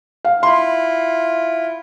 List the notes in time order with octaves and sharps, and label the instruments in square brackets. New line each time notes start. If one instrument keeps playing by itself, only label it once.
[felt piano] F5
[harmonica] E4 F4 [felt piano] C6